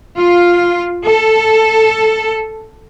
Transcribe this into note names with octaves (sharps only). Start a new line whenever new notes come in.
F4
A4